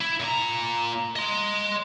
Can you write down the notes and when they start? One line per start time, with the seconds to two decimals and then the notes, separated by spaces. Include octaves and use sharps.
0.01 E4
0.20 A#2 A#5
1.16 D#5 C6